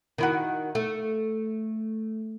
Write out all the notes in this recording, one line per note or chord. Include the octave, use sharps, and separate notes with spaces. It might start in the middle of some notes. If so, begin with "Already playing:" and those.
D#3 E4 F#4
A3